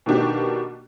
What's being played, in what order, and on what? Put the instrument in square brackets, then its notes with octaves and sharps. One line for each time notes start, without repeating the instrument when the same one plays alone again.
[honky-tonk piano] B2 D#3 A#3 D4 F#4 G4